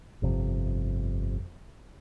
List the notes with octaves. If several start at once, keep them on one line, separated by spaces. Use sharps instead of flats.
G1 F2 C3